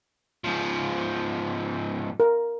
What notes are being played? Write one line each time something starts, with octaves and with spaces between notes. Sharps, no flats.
G#2 F3
A#4